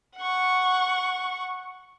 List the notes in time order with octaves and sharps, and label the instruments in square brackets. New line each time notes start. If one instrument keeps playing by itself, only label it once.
[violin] F#5 C#6